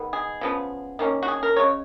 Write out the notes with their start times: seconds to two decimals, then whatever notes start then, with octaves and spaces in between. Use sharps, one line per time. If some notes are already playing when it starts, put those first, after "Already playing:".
Already playing: D#3 G#3 B3
0.13 G#4
0.41 C#3 F3 B3
0.99 D#3 A#3 C#4
1.23 F#4
1.28 G#4
1.43 A#4
1.56 C#3 G#3 C#5